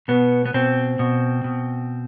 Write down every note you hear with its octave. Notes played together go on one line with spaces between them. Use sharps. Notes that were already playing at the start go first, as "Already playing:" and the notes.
B2 B3
B3
B2 C4
B2
B2